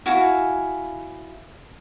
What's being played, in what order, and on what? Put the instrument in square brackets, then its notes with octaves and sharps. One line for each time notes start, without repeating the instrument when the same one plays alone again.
[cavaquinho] E4 F#4 F5 G#5